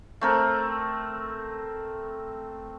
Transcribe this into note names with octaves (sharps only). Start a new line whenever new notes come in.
A3 C4 A#4